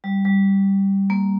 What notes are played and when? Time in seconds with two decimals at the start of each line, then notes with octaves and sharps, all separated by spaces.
0.04 G3
0.25 G3
1.10 A#3